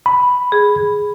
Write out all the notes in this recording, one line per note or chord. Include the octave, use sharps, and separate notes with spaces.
B5
G#4